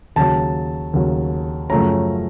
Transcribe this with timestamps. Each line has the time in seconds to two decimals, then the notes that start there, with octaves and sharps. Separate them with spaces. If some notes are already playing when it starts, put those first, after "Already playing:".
0.16 D#2 C#3 F#3 A5
0.93 D#2 C#3 F#3
1.70 F#2 C#3 F3 A3 C#4 A#5